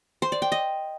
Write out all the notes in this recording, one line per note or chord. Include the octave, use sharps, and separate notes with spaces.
C5
D5
G5
D#5